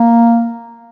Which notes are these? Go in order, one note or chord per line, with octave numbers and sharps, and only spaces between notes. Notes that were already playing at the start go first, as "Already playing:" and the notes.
Already playing: A#3